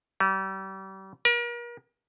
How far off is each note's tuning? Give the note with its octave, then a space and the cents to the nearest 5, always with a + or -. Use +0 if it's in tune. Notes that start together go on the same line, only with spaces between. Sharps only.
G3 -35
A#4 +40